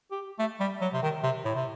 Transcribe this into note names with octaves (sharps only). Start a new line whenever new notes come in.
G4
A3
G3
F#3
C3
D#3
C3
A2
C3